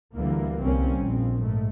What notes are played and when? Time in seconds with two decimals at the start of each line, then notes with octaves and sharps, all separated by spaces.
0.15 D2 D3 E3 G3 A#3
0.61 C2 G3 A#3 C4 C#4
1.01 A#1 F2 C4
1.41 G#2 A3